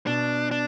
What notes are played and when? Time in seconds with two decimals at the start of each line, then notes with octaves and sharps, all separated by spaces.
0.07 B2 D4
0.51 D4